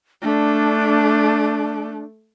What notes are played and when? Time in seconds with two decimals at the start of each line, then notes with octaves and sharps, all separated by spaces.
0.22 A3 D4